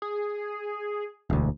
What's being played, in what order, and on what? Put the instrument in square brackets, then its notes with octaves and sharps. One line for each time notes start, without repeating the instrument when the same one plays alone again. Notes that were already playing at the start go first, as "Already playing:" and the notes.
[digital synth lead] G#4
[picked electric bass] E1 D2